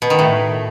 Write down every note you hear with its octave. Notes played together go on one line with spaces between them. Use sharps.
B2
D#3
A2